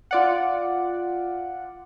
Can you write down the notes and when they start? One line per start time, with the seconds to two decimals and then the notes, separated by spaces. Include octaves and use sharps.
0.11 F4 D5 F#5